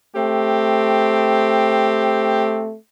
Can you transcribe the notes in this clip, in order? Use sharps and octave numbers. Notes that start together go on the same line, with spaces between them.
A3 C4 G4